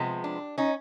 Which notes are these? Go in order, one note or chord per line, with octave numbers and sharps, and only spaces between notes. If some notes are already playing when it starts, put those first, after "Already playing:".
Already playing: C3 F3 G#3 B3
D4
C#4 D#4